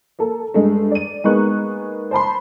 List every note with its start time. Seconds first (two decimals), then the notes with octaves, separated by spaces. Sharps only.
0.19 A#3 A4
0.54 G2 G#3 A3
0.91 D5 D#7
1.24 G#3 A#3 B3 D#4 C#6 F#6
2.11 C5 A5 B5 C6